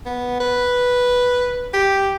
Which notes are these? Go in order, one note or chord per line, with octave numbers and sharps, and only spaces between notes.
B3
B4
G4